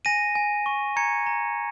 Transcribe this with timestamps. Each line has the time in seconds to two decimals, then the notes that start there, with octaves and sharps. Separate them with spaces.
0.05 G#5 A#6 D#7
0.35 G#5
0.66 C#6
0.96 A#5 G#6 C#7
1.26 A#5